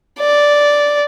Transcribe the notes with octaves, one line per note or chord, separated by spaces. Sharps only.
D5